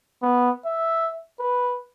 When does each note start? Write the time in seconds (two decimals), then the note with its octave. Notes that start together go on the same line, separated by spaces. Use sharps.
0.23 B3
0.66 E5
1.40 B4